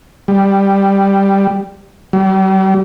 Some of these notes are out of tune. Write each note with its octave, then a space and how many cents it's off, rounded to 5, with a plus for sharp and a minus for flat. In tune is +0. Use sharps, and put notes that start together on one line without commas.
G3 +5
G3 -40